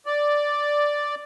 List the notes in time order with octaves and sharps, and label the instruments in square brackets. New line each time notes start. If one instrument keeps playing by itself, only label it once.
[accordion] D5